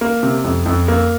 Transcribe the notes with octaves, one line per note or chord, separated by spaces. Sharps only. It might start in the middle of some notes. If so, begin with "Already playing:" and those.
A#3
C3
F2
F2
A#3